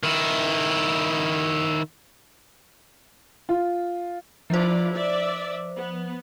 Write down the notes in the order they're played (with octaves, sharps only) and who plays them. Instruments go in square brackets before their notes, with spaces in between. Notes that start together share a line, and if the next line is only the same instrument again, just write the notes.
[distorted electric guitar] D#3 E4
[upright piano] F4
[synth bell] F3 C5 [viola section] E4 F4 D5
[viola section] D5 E5
B3